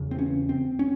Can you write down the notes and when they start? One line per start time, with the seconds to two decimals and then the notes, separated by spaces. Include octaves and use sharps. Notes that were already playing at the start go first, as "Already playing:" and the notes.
Already playing: E2 C#3
0.11 C4
0.19 C#4
0.49 C4
0.79 C#4